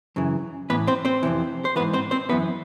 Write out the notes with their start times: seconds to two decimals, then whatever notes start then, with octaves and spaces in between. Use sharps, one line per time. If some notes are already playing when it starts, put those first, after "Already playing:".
0.16 F#2 C#3 E3
0.70 A2 E3 B3 B4
0.87 C4 C5
1.05 C4 C5
1.23 F2 C3 E3
1.65 C5
1.76 E3 B3 B4
1.80 G#2
1.93 C4 C5
2.11 C4 C5
2.29 F#2 C#3 E3 B3 B4